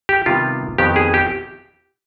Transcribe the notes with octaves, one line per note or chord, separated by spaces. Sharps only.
G4
C3 D#3 G3 B3 F4
F2 D#3 B3 G4
G#4
G4